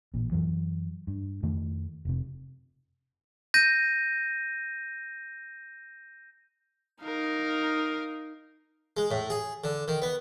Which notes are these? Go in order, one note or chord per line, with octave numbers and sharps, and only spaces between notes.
A1 A#2
F#2 E3 F#3
G2
F2 D#3 A3
F1 C3
G6 A#6 D#7
D#4 A#4 F5
G#3
A2
G#4
D3
D#3
B3